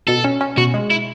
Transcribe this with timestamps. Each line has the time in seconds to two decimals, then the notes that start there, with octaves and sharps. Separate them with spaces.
0.07 B2 A4
0.24 C#4
0.41 C#4
0.57 B2 F#4
0.74 G#3
0.90 E4